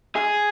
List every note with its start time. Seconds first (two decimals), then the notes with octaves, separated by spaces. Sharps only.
0.16 G#4